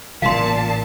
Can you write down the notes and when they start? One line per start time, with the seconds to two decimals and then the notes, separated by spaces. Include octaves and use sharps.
0.22 A1 A#2 C#3 E3 F5 A5 C6